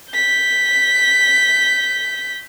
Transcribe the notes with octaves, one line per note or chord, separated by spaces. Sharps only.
G6 B6